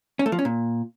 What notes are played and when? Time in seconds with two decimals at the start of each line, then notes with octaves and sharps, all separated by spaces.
0.19 C#4
0.26 A3
0.32 F3
0.39 C#4
0.45 A#2